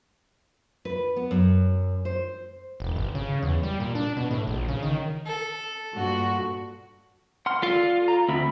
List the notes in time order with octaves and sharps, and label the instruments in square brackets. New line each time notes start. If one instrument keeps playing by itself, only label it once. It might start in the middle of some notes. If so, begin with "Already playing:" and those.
[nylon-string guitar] B4
B3
F#2
C5
[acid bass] E1
G1
C#3
E2
G3
A#2
D4
B2
A2
A#1
C#3
D#3
[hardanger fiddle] A4
[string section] G2 A#2 F#4
[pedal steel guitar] F#5 C6 F6
[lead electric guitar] F4 [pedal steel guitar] A4 D5
[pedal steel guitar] A#5
[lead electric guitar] D2 [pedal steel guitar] C4 E5 B5